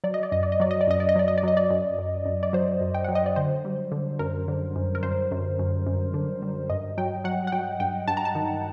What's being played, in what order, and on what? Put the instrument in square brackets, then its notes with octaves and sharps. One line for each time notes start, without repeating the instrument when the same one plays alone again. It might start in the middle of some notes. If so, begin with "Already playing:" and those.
[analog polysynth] F#3 D5
D#5
D5
F#2 D#5
D5
D#5
F#3 D5
D#5
D5
F#2 D#5
D5
D#5
F#3 D5
D#5
D5
F#3 D#5
D5
F#2
F#2
F#2
D5
F#3 C5
F#2
G5
F#3 F#5
D#5
D5
D3 C5
G3
D3
F#2 A#4
D3
F#2
A#4
F#2 C5
F#2
F#2
F#2
D3
G3
G2 D#5
F#3 G5
F#3 F#5
F#5
F#3 G5
G2 G5
G2 A5
A#5
A5
D#3